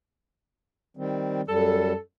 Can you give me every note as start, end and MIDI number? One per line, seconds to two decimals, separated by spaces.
0.97 1.41 51
0.97 1.41 55
0.97 1.41 60
1.48 1.93 42
1.48 1.93 55
1.48 1.98 69